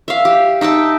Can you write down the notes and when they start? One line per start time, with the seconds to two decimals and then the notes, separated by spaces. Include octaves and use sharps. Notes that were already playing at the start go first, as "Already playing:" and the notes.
0.08 E5 F5
0.25 G4
0.61 D#4 E5 G5 A5